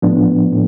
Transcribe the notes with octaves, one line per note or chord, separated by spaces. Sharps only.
A2 F3 B3 D4
A2